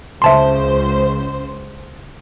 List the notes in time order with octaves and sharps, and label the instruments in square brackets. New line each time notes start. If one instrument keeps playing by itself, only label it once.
[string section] C#2 C#3 C5 [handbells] E5 A5 C6